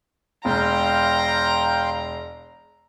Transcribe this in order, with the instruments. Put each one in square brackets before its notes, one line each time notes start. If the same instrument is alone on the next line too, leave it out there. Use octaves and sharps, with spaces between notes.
[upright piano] E1 [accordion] F5 G5 C6 [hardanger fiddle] A#5